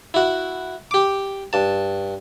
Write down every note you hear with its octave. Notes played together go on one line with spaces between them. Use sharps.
E4 F#4
G4 D6
G2 A5